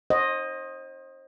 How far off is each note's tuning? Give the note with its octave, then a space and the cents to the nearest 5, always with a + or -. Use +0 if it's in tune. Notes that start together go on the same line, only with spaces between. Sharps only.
C5 +35 D#5 +0 F#5 +0